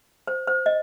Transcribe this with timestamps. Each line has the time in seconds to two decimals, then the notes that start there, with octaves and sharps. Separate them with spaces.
0.27 C5
0.47 C5
0.66 D#5